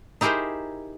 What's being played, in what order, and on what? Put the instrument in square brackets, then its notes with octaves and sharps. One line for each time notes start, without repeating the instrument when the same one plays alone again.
[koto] D#4 E4 G4 G#4 A#4 C5